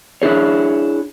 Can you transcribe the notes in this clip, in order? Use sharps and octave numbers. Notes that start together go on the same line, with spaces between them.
D4 E4 G#4 C#5